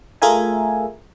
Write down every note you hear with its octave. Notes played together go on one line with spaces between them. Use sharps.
A3 F4 G#4 A#4 E5 G#5